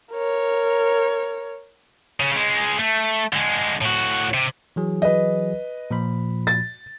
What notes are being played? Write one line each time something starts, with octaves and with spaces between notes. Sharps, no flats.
A#4 C#5
C#3
C#3 G#3
A3
D3 G#3
A2 F#4
C3
E3 F#3 G#4
B4 D#5
A#2 F3 B5
A6